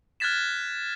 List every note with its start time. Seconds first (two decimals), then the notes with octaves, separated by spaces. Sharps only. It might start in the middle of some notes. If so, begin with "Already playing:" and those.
0.20 F6 F#6 G#6 A6 B6 E7